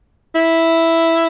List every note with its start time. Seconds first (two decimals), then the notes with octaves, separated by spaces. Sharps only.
0.35 E4